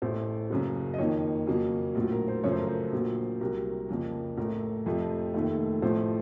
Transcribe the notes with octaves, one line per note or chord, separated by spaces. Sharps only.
A1 A2 A3 C5
F#1 F#2 C#3
D#5
F2 D#3 A#3 C#5
F2 C#3 F#3 A#3
A#1 A2 F#3
A#4
C5
F#2 C#3 F3 A3 C#5
C5
A#4
C5
A#1 A#2 F#3 A#3
C2 C3 F#3 A#4
F2 C#3 F3 A#3
A1 A2 A3 A#4
F2 C3 F3 A3
F1 D#2 D#3 A3
A1 A2 F3 A3 C5